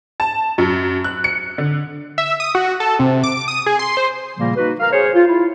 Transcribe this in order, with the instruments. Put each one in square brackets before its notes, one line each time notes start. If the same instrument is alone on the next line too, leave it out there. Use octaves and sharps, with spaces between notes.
[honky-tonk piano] A5
F#2
F#6
C#7
D3
[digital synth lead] E5
D#6
F#4
A4
C3
D6
D#6
G#4
C6
C5
[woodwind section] A#2 C#3 F3 G3 A#3
D#4 F#4 B4
A#4 F5
G#4 C5 C#5
F4
E4 F4